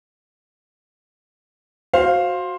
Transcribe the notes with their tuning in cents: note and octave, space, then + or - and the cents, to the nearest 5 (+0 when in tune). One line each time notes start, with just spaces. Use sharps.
F#4 -10 C5 +15 F5 +0